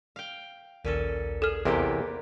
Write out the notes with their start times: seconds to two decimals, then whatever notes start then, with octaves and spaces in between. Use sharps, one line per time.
0.16 F5 G5
0.85 A#1 D#2 A#2 C#4 A4
1.42 G#4 A4 F6
1.65 E2 C3 A#3 B3 G4